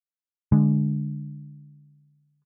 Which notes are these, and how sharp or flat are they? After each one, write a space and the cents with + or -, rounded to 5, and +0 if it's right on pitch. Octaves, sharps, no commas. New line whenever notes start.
D3 +0 G#3 +0